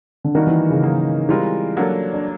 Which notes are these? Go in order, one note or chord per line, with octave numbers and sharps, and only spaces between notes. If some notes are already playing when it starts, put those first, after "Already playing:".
D3
D#3 G3 A#3 D4 F#4 A#4
E3
C#3
F#3 A#3 D#4
E3 G3 G#3 C4 F4 A#4
F#3 A#3 D4 F#4 A4
D4